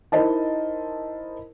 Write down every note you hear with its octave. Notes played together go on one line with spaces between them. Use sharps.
D#4 E4 A#4 C5 D#5 A5